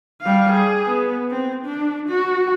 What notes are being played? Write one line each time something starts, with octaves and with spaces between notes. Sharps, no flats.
G3 F5
G#4
B3
C4
D4
F#4